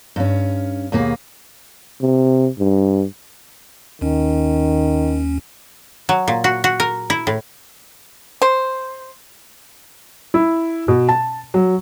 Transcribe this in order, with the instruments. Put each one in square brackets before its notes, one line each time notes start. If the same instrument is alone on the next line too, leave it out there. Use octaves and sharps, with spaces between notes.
[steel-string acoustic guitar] G2 C#4
D#2 B2 A#3 G#4
[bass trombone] C3
G2
[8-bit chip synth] D#2 C#4 [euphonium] D#3
[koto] F#3
A#2
F#4
F#4
A#4
E4
A2
[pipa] C5
[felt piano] E4
B2
A5
F#3